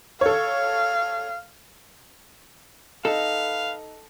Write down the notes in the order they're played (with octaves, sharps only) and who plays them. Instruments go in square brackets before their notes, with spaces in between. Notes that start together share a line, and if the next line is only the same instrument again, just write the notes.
[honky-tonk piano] A4 C#5 [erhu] F5
[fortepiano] D#4 [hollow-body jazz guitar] A4 [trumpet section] B4 F5